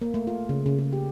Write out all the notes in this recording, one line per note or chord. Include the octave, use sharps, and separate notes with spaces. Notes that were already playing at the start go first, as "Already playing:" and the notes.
A#3
A3
F4
C#3
C#3
C#3
G4